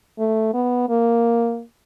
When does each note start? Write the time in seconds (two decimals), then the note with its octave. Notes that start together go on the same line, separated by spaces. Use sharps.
0.19 A3
0.54 B3
0.89 A#3